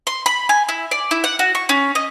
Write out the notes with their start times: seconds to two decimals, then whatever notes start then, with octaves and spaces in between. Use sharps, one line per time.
0.07 C6
0.26 B5
0.49 G#5
0.69 E4
0.91 D5
1.11 E4
1.24 F#5
1.39 F#4
1.55 C#6
1.69 C#4
1.95 D#5